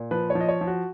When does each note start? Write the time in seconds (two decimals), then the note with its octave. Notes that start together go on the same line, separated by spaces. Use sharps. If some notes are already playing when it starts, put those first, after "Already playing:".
Already playing: A#2
0.11 F3 B4
0.30 C#5
0.35 F3
0.41 D#5
0.48 C#5
0.61 F3
0.67 F#4